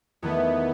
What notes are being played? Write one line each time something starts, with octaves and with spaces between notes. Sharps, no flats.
E2 D#3 A3 B3